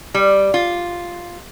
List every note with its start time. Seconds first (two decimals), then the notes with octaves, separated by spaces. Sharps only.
0.14 G3
0.54 F4